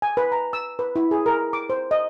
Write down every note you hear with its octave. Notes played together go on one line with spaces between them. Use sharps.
G#5
B4
A#5
E6
B4
E4
G#4
A#4
D6
C5
D#5